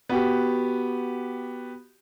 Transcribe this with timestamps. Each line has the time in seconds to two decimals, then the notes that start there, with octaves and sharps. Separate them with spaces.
0.09 B3 F#4 G4